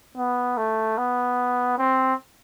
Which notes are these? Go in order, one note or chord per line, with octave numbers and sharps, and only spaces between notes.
B3
A3
B3
C4